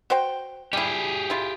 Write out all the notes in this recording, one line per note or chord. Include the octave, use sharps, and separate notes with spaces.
F#4 C5 G5
G3 E4 G4 G#4
E4 F4